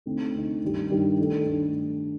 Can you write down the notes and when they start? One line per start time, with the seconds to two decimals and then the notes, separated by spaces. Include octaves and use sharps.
0.06 D3 A3 C4 D#4
0.34 D3 A3 C4 D#4
0.62 G2 D#3 G3
0.90 G2 D#3 G3
1.19 D#3 A3 D4 A4
1.47 D#3 A3 D4 A4